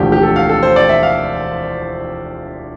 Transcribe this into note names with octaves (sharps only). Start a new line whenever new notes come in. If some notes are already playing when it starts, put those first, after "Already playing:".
Already playing: E1 D2 D3 F3 G4
G4
A4
F5
A4
C5
D5
E5
F5